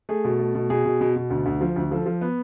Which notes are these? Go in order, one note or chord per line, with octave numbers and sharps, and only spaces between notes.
A3 G#4
B2
A3
B2
B2 G#4
B2
B2
B2
D2
D2
F3
D2
F3 A4
F3
B3